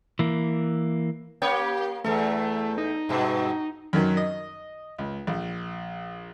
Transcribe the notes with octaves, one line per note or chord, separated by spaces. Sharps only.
E3 A#3
A#3 G4 C#5
E2 A3 A4
D#4
G2 B2
F#2 D#3 F#3
D#5
C#2
A#1